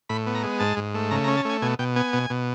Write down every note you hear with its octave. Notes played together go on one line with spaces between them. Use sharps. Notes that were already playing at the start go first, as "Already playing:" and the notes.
A2 B5
B3
A#5
G#3
G#2 A5
G#2
A3
C#3 A#5
A#5
C#4
A5
A3 G#5
B2 G#5
B2 G5
B3 G#5
B2
B2